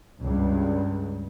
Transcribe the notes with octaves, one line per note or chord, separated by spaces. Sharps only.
C#2 G2